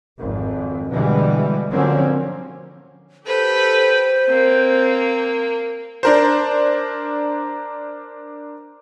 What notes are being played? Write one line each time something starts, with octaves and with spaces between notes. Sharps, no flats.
G#1 F2
B2 D3 E3 G3 G#3
D3 F3 F#3 A#3 C4 C#4
G4 A4 B4 C5
A#3 C4
D4 A#4 C5